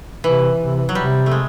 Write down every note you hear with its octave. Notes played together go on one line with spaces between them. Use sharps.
C3 E3
C3
F#3
C3 G3
A3
G#3